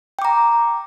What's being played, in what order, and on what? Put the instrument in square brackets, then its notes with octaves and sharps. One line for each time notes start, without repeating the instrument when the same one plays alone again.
[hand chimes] G5
D6
A#5